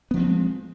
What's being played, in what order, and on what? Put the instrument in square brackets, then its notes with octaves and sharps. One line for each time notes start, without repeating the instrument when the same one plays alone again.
[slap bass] B3
F3
C4
G#3